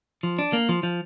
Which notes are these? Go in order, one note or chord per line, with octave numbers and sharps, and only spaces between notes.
F3
D4
A#3
F3
F3